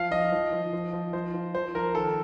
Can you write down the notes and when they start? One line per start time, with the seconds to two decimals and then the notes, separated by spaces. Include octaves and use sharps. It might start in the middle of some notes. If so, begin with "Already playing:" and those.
Already playing: F3 F5
0.11 F3 D#5
0.32 F3
0.52 F3
0.73 F3
0.93 F3
1.13 F3 C5
1.34 F3
1.54 F3 C5
1.75 F3 A#4
1.95 D#3 A4